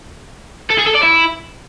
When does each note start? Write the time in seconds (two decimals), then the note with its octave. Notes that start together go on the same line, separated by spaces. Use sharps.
0.70 A4
0.78 G#4
0.86 A4
0.94 D5
1.03 E4